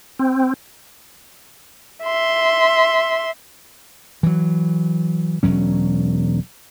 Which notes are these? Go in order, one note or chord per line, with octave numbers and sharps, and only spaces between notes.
C4
E5 C6
E3 F#3
E1 F#3 C#4